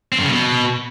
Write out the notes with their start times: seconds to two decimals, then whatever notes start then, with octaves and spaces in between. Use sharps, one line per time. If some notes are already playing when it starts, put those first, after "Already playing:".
0.12 C4
0.19 F#2
0.25 C#3
0.31 B2